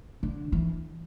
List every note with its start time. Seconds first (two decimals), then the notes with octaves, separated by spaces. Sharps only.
0.23 D3
0.52 E3